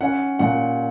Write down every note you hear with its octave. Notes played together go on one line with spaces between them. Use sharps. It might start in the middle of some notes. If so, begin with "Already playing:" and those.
C#4 F#5
A#2 F#5